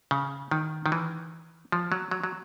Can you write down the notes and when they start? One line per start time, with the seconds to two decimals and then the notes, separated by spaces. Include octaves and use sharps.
0.11 C#3
0.51 D#3
0.86 D#3
0.92 E3
1.72 F3
1.92 F#3
2.11 F#3
2.24 F#3